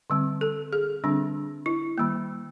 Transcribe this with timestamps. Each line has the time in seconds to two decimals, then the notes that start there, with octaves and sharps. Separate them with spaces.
0.10 D3 G3 C4
0.41 A4
0.73 G#4
1.04 D3 G3 C4 D4
1.66 E4
1.98 D#3 G3 A#3